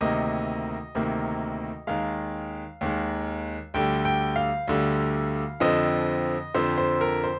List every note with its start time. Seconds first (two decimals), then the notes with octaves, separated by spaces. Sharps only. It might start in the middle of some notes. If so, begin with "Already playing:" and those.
0.01 D2 C3 D#3 A#3 D#5
0.95 D2 C3 D#3 A#3
1.87 D#2 D#3 G#3 F5
2.81 D#2 D#3 G#3
3.74 D2 D3 G3 G5
4.05 G5
4.36 F5
4.67 D2 D3 G3
5.60 F2 D3 F3 C4 D#5
6.54 F2 D3 F3 C4 C5
6.78 C5
7.01 A#4
7.24 C5